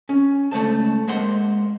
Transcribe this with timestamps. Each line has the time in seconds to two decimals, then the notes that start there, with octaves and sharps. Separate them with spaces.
0.09 C#4
0.51 C#2 A3 C5 A5
1.08 G#3 A#3 C5 F#5 C6